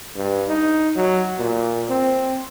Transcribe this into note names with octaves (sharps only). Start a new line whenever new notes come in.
G2
D#4
F#3
A#2
C4